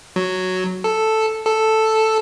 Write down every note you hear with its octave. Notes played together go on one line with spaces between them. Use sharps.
F#3
A4
A4